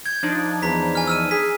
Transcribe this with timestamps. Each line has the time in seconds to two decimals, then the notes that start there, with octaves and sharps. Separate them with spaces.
0.06 G6 G#6
0.23 F3 D4 D#4
0.62 E2 A#5 B6
0.95 G#5 F6
1.07 E6 F6 D#7
1.31 G#4 B6